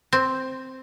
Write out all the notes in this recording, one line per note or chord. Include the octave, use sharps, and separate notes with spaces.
C4